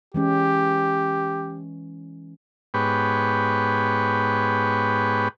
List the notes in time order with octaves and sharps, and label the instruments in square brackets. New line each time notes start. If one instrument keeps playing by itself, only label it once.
[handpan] E3 G#3 C#4 [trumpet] G4
[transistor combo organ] G#2 B3 G4 B4 C#5